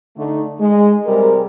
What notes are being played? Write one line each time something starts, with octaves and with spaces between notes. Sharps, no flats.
D3 A3 D#4
G#3
C3 G3 G#4 A#4